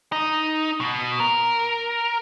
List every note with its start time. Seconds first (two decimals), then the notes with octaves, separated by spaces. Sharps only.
0.12 D#4
0.81 B2
1.20 A#4